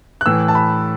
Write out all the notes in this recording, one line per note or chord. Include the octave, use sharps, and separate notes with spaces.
F#6
A2 E3 E6
A5
B5